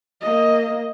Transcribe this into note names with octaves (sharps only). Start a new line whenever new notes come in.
A#3 D#5